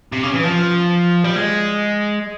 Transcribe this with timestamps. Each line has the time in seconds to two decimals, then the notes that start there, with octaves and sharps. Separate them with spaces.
0.13 C3
0.23 C#3
0.33 E3
0.44 F3
1.24 G3
1.35 G#3